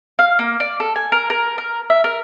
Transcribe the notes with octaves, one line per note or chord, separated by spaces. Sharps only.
F5
A#3
D5
A4
G#5
A#4
A#4
A#4
E5
A#4